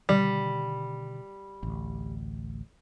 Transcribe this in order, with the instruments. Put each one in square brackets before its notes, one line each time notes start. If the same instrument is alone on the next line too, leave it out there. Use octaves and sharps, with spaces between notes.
[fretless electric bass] B2 D3 D#3 [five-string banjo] G3
[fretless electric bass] A1 D2